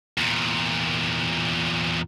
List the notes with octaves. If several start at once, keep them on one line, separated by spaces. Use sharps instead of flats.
E2 A#2